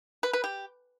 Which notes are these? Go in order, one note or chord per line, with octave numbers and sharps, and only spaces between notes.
B4
B4
G4